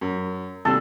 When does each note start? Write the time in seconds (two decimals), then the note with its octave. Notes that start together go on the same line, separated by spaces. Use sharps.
0.01 F#2
0.65 D#2 C3 G3 A4